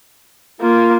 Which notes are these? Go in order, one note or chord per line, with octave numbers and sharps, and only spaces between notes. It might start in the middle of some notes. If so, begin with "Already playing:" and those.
A#3 F4